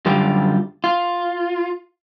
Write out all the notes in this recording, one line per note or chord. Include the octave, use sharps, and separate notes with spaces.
F#2 D3 G3 F4 G4
F4